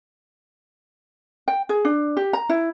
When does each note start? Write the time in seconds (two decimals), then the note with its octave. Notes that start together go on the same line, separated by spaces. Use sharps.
1.48 G5
1.69 G#4
1.85 D4
2.17 G4
2.33 A#5
2.49 E4